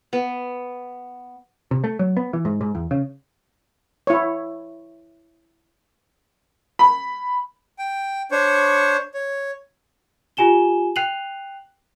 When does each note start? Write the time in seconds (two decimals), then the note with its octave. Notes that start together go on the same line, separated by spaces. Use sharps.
0.13 B3
1.71 C3
1.84 A3
1.99 F#3
2.17 B3
2.33 E3
2.45 G#2
2.61 G#2
2.75 E2
2.91 C#3
4.07 E4 C#5
6.79 B5
7.79 G5
8.31 D4 C5 C#5 C#6
9.14 C#5
10.37 F4 G4 G#5 E7 G7
10.96 G5 F#6 C7 D#7 F7 F#7